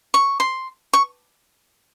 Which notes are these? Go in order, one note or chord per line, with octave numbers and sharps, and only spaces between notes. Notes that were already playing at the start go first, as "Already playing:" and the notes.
C#6
C6
C#6